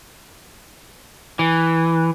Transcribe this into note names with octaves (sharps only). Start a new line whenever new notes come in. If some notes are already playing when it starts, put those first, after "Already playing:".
E3